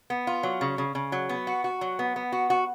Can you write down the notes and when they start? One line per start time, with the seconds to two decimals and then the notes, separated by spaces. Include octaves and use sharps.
0.10 B3
0.27 F4
0.43 F#3
0.61 C#3
0.78 C#3
0.95 C#3
1.12 F#3
1.29 B3
1.47 F#4
1.64 F#4
1.81 F#3
1.99 B3
2.16 B3
2.32 F#4
2.50 F#4